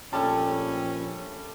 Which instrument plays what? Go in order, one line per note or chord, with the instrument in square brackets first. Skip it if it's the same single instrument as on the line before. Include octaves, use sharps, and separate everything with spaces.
[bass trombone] A#1 [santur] G3 A3 [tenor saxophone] C#4 [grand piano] A5